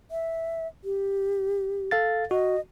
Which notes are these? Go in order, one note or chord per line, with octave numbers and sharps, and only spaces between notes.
E5
G4
A4 F5 A6
F#4 D#5